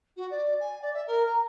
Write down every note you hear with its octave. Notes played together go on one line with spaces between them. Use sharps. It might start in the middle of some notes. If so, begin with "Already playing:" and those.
F#4
D5
G#5
D5
E5
A#4
A#5